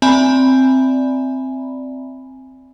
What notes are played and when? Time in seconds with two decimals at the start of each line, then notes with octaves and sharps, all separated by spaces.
0.02 C4 D5 E5 G#5 A#5 B5